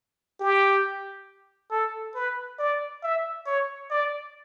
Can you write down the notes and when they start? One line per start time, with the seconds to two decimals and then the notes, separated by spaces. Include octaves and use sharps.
0.40 G4
1.71 A4
2.15 B4
2.59 D5
3.03 E5
3.46 C#5
3.91 D5